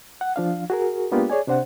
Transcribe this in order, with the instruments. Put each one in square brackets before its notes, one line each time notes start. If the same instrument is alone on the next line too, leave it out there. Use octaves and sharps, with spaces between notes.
[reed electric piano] F#5
F3 D4 F5
F#4 G#4 A#4
G#3 A#3 B3 D4 F4 G4
G#4 C#5 D5 G#5
C3 D4 C5 F#5